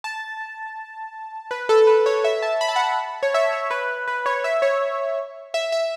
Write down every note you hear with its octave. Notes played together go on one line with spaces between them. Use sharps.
A5
B4
A4
B4
C#5
E5
A5
B5
A5
F#5
A5
C#5
E5
C#5
B4
B4
C#5
E5
C#5
E5
E5